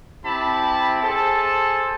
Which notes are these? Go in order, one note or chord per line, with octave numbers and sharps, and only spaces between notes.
C4 E4 G4 A5 B5
G#4 A4 C5 A5